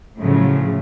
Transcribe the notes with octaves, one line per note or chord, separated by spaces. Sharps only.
A2 C#3 F3 F#3 A3